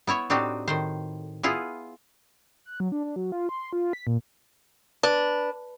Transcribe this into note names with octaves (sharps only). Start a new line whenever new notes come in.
B3 E4 C#5 E5
A2 C4 D4 D#4 F#4 G4
A2 D#3 C5
B3 E4 F4 G#4
F#6
F#3
D4
D4
F#3
F4
C6
F4
B6
A#2
D4 B4